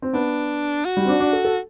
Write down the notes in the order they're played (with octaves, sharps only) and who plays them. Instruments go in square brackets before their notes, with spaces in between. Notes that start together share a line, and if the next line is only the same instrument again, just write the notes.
[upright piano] C4
[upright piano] B3 [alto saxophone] D4
[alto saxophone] F#4
[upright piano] G3
C4
D4
D4
A4
A4